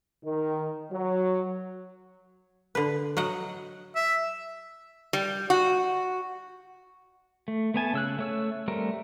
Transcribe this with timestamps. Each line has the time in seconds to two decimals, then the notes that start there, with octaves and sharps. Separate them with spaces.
0.24 D#3
0.92 F#3
2.75 D3 B4
3.17 F#3 D#5 F#5
3.96 E5
5.13 G3
5.50 F#4
7.48 A3
7.74 A3 B3 G#5 A5
7.93 C#3 E6 F#6
8.19 A3 C#5 E6
8.68 G3 A3 C4 A#4